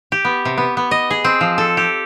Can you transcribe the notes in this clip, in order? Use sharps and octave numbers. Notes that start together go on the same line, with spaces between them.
G4
B3
C3
B3
B3
D#5
G#4
C4
F3
A4
G4